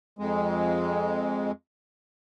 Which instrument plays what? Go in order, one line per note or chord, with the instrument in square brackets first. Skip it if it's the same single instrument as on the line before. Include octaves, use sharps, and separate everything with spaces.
[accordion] F2 G#3